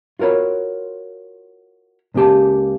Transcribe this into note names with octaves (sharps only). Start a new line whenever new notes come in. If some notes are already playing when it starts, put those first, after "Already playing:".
F4 F#4 A#4 C#5 B5
C#2 C#3 A#3 G4 A5